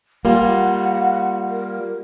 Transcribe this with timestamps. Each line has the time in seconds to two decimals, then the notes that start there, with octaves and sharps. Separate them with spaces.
0.25 G3 A#3 F4 F#5
1.48 A#4